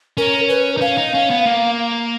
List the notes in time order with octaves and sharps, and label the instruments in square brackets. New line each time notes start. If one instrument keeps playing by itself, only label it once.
[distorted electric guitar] C#4 [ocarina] A#4
[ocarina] B4
[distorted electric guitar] D#4
[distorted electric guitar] C#4 [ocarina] F5
[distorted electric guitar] D#4
C#4
B3
A#3